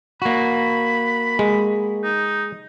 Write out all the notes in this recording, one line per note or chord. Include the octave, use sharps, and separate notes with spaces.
A#3 F#4 B5
G#3
D#4